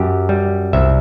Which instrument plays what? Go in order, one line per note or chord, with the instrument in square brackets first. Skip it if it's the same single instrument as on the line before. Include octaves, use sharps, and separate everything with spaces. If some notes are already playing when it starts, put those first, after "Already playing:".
Already playing: [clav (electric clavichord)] F#2 G4
G3
C2 E5